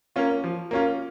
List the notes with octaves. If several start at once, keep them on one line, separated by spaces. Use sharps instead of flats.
A#3 C#4 F4
F3
A#3 C#4 F4